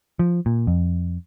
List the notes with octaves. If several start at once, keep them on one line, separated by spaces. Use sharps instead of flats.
F3
A#2
F2